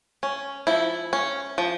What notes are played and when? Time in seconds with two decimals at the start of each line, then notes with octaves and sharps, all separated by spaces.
0.23 C#4
0.67 F3 E4
1.13 C#4
1.58 F3